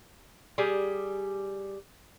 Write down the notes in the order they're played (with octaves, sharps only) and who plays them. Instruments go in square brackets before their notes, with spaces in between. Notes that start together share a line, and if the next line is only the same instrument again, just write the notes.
[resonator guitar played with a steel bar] G3 G4 G#4 G#5